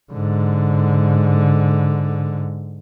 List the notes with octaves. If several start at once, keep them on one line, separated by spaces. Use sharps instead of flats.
G#2 D3